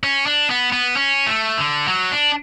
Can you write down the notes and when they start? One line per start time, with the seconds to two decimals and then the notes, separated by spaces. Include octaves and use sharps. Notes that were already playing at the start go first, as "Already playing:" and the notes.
0.03 C#4
0.26 D4
0.50 B3
0.72 B3
0.96 C#4
1.27 A3
1.58 D3
1.88 F#3
2.12 D4